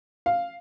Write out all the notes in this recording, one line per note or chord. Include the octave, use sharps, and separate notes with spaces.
F5